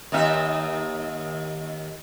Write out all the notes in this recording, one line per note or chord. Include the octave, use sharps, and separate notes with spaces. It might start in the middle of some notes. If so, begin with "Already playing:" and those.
D#2 D#4 E5